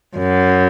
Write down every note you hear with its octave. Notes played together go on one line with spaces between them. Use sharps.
F#2